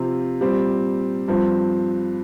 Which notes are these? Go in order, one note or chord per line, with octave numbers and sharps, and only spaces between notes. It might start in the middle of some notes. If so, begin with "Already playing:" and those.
Already playing: C3 F3 C4 F4
A#2 G3 C4
G2 F3 C4